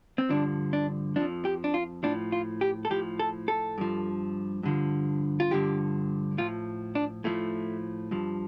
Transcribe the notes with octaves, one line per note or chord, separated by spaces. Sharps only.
C4
G2 D3 F3 D4
D4
F2 F3 D4
G4
D4
F4
A2 F3 D4
F4
G4
A4
A2 F3 G4
A4
A4
G2 F3
G2 D3 F3
F4
G2 D3 F3 G4
A2 F3 F4
D4
A2 F3 A3
G2 F3